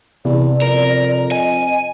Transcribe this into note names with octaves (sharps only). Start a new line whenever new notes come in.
E2 C3 D5
F2 A#4
D#5 G#5